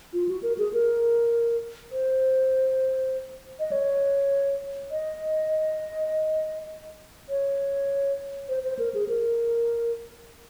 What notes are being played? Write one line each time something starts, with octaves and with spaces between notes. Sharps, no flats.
F4
F#4
A#4
G#4
A#4
C5
D#5
C#5
D#5
C#5
C5
C5
A#4
G#4
A#4